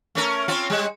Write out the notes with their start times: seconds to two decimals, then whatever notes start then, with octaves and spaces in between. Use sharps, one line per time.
0.15 A3 C#4 A#4
0.48 C4 C#4 F4
0.70 G3 G#3